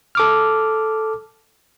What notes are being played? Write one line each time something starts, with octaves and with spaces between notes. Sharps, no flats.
A4 D6 F6